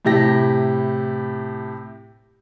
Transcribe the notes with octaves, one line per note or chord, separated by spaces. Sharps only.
A2 C3 E4 G4 A#6